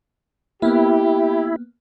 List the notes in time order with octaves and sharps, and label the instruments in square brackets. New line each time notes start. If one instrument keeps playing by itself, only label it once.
[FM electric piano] A#3 B3 [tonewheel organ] E4 [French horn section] G4